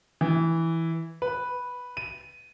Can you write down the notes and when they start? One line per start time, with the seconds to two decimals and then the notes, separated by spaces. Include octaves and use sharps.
0.21 E3
1.22 B4
1.97 D#7